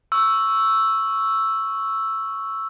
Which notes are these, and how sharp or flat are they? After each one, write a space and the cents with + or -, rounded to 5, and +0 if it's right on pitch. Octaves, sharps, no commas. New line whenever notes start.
C#6 +0 E6 +0